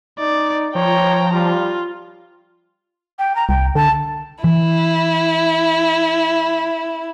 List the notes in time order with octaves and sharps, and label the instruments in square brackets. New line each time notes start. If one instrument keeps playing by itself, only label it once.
[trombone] D#4 [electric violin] D5
[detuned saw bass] F3 [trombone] C#5 [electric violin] G5 A#5
[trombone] G3 [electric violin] F4
[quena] G5
A#5
[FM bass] C2 [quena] G5
[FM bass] D3 [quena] A5
[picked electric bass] E3 [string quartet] E4